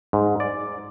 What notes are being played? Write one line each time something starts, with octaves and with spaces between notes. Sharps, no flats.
G#2
D5